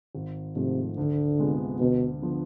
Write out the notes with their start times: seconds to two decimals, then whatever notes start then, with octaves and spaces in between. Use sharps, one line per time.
0.15 G#1
0.56 G#2 C3 F3 A3
0.97 D2 D3
1.39 C3 G#3 B3 F4
1.80 D2 B2
2.22 D3 F3 B3